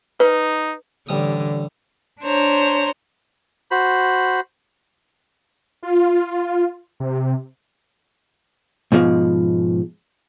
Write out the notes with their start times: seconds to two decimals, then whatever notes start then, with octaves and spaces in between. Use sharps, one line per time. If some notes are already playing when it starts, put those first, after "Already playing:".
0.20 D#4 B4
1.09 A1 D3 G3 D#6
2.23 D4 C5 C#5 A#5
3.71 F#4 C5 B5
5.83 F4
7.00 C3
8.92 G#2 B2 F3 G#3